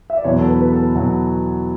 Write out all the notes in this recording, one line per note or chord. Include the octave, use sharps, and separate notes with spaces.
E5
D5
E2 B2 F#3 C#5
A4
B4
B4
A4
E2 B2 F#3